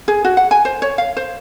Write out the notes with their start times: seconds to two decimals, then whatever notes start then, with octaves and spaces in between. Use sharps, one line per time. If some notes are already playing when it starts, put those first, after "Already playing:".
0.08 G#4
0.25 F#4
0.37 F#5
0.51 G#5
0.65 C5
0.82 C#5
0.98 F5
1.17 C5